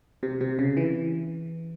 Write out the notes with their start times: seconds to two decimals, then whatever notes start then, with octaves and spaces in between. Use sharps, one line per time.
0.23 C3
0.41 C3
0.59 C#3
0.77 E3